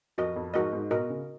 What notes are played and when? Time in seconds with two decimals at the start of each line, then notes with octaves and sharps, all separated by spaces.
0.18 F2 F#4 A#4 D#5
0.36 F2
0.54 G#2 F#4 A#4 D#5
0.73 G#2
0.91 B2 F#4 A#4 D#5
1.10 C#3